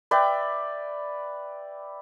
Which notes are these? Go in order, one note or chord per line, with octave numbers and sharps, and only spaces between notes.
B4 D5 E5 G5